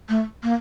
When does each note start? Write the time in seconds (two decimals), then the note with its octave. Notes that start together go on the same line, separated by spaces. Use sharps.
0.09 A3
0.43 A#3